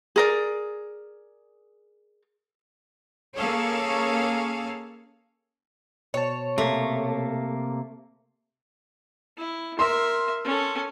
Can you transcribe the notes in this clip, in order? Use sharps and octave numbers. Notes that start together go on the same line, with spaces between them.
G#4 A#4 D5
A#3 C#4 G#4 A4 C#5 F5
B2 C5 C#5 A5
C3 A3 A#3
E4
A#4 E5 C6
C#4 A4